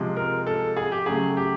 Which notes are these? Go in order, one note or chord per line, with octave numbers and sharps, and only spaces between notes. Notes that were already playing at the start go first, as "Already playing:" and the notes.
Already playing: C3 F3 G#3
A#4
A4
G#4
G4
C#3 F#3 A3 G#4
G4